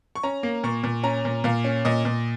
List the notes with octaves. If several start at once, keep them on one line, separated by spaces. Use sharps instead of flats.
C#6
C#4 A#5
A#3
A#2 C#6
A#2
C#4 A#5
A#2
A#2 F5
C#4
A#2 D#5
A#2